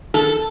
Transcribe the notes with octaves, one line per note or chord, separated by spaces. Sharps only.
A4